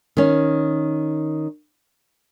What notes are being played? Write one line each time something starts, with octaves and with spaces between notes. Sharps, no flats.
D#3 C#4